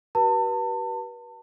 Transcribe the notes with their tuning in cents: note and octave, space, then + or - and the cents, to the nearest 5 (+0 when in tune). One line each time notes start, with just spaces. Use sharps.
G4 -40 B4 -35 A5 +35